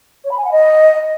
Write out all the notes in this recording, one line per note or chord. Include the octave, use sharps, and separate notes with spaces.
C#5
B5
G#5
F#5
D#5